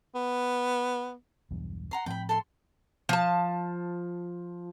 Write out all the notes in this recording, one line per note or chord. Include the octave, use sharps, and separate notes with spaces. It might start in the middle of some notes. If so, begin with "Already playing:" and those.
B3
B1 E2 G2
F#5 A#5 C6
A2 F3 C4 G5 B5
A4 C6
F3 A5